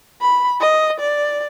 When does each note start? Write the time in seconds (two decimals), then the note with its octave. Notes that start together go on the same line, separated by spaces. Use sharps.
0.21 B5
0.60 D#5
1.00 D5